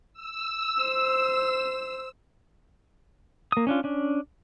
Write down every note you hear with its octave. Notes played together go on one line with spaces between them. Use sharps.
E6
C5
A#3 D#6
C#4 D4 F4
C#4 D4